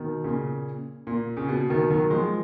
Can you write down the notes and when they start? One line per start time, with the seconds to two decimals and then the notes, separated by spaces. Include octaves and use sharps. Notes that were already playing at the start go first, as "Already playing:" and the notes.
Already playing: B2 D#3
0.24 A#2 C#3
1.07 A#2
1.37 C#3
1.48 B2
1.69 B2 D#3
1.90 D#3 F#3
2.10 F3 G#3